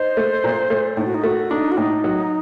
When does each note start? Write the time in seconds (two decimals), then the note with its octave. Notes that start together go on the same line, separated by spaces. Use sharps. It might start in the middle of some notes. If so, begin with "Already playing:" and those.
Already playing: D#4 C5
0.17 A3
0.44 A#2
0.70 A3
0.97 A2 D#4
1.06 F#4
1.14 D#4
1.24 A3 F#4
1.50 D4 D#4
1.72 F#4
1.77 A2 D#4
2.04 F#3